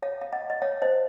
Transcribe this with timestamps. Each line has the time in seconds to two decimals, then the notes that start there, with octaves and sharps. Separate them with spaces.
0.02 C#5 F5
0.21 F5
0.33 D#5 F#5
0.50 D#5
0.62 C#5 F5
0.82 C5 D#5